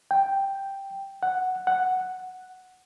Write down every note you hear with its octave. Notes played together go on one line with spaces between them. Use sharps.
G5
F#5
F#5